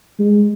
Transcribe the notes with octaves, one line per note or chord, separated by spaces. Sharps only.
G#3